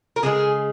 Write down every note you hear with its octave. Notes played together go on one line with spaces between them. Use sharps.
A#4
C#3 F3 G#3 G#4